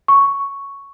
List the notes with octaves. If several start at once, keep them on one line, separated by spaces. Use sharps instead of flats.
C#6